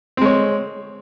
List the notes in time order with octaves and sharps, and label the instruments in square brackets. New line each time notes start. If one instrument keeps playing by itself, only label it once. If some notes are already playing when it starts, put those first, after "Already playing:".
[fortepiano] C4
G#3
C#5